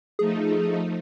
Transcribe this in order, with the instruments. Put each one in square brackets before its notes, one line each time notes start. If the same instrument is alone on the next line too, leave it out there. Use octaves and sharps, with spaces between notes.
[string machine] F3 A3 D#4 [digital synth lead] G#4